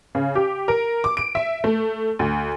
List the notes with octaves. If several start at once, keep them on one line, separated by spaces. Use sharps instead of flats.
C#3
G4
A#4
D6
D7
E5
A3
D2